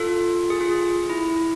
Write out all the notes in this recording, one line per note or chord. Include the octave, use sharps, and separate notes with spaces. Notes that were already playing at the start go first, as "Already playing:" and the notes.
Already playing: F4 A4
G#4
F4
G#4
E4